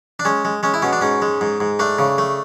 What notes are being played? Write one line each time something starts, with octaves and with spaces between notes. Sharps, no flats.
D4
G#3 C#4
G#3
G#3 C#4
E4
B2 C#4
D4
G#2 C#4
G#3
G#2
G#2
A3 D4
C#3
A3